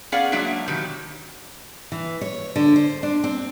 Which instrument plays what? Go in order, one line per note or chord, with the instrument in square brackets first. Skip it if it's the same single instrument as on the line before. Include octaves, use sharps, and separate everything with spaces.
[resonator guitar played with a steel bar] B3 C#4 G#4 D5 F5 F#5
F#3 G#3 A#3 D4 E5
B2 D#3 F#3 G4
[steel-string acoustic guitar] E3
C#5
D3
C5
D4
C4